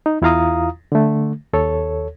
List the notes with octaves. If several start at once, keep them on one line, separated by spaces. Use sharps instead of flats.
D#4
E2 E4 F4 F5 A#5 D#6
D3 A3
D#2 A4 C#5